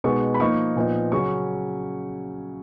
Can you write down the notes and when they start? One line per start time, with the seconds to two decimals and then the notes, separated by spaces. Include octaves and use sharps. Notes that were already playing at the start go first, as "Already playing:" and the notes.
0.04 B2 G#3 B3 D#4 C#6
0.34 B5
0.40 F3 A#3 D#4 C#6
0.76 A#2 F3 B3 D#4
1.12 C#3 F#3 C#4 C#6